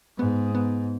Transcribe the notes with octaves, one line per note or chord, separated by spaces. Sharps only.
G#2 B3
B3